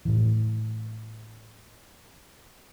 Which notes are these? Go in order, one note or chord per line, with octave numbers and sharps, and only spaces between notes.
A2 E3